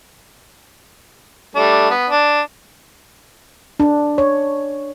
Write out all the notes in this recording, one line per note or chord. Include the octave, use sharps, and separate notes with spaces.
G3 A3 D4
B3
D4
D4
C#5